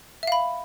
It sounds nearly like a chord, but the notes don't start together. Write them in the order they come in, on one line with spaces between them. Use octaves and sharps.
E5 F5 B5